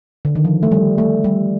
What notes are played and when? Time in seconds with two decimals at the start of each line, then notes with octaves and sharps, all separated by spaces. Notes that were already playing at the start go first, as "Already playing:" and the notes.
0.25 D3
0.35 D#3
0.45 F3
0.63 A3
0.72 G3
0.98 A3
1.24 G3